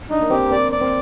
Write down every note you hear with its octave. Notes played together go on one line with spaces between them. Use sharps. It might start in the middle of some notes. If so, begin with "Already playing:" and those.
D4 D#4
A#3
C4 G4
A#3
C4 D5
A#3 D5
C4